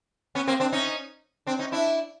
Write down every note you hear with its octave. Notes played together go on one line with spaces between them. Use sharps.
B3 C#4
A#3 C4
C4 D4
C#4 D#4
C4 D4
C#4 D#4
D4 E4